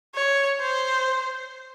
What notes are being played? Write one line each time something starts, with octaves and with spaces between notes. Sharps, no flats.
C#5
C5